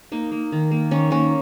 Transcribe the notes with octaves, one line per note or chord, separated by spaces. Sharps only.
A#3 D#4
A#3
D#3
A#3
D#3 C#4
A#3 C#4